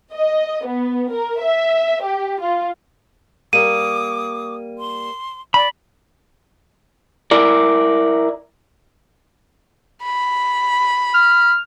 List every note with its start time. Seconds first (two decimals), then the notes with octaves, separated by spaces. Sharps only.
0.12 D#5
0.66 B3
1.12 A#4
1.41 E5
2.02 G4
2.41 F4
3.53 G3 A#3 D6 D#6 D#7
4.77 C6
5.54 D5 B5
7.31 E4 A#4 D5
10.03 B5
11.14 F6